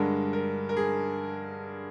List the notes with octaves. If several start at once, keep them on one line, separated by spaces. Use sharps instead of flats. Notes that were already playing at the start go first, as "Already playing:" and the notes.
Already playing: G2 D3 G#3 A#4
A#4
A#4
G#4